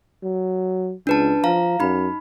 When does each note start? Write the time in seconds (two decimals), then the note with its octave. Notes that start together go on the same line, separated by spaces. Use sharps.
0.23 F#3
1.07 C#2 D4 B4 A5
1.44 F3 F5 A#5
1.80 F#2 D#4 B5